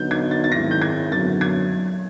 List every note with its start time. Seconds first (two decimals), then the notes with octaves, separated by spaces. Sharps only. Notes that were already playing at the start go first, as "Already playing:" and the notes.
Already playing: D3 F#3 B3 D#4 G6
0.11 G#6
0.31 A6
0.44 A6
0.51 G#2 D#3 G#3 C4 E4 A#6
0.71 G6
0.82 G#6
1.11 F#2 D3 F#3 B3 A6
1.41 G#6